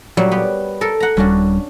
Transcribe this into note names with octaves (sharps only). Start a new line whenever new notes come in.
A#2 F#3 G3
B3 G4
A4 A#4
F#5 A#5
D#1 G3 C#4 D4 F#4